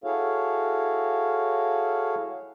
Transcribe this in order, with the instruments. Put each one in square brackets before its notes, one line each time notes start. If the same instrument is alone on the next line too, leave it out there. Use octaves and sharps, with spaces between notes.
[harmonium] E4 F#4 G#4 A4 C#5 F5